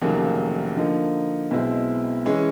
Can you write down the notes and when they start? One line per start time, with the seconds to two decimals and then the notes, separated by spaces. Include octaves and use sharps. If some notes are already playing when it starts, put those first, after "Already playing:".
0.02 F1 D#2 C#3 F#3 A#3
0.77 D3 F3 A#3 D#4
1.51 B1 B2 G#3 C4 E4
2.26 E3 G#3 C#4